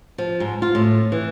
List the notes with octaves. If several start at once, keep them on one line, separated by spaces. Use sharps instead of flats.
F3
G#2
F4
A2
E3